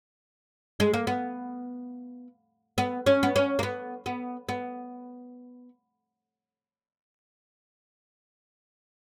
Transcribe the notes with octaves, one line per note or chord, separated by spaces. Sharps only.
G#3
A#3
B3
B3
C#4
B3
C#4
A#3
B3
B3
B3